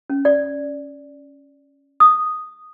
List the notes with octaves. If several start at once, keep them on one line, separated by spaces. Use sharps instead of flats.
C#4
D5
D#6